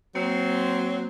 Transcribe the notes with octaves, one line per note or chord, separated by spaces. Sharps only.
F#3 A#3 C4